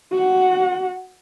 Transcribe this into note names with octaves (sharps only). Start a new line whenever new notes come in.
F#4 F#5